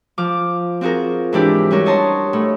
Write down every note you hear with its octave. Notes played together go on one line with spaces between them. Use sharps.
F3 D6 F6
C4 F4 F#4 G#4 A#4
G#2 E3 D4 E4 G4 D5
G3 C#4 F#4 A#4
C#5 D#5 A5 A#5 C6 D#6
A2